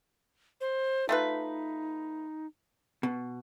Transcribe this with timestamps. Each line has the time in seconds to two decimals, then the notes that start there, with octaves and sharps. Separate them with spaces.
0.61 C5
1.09 A3 D#4 F4 B4
3.03 B2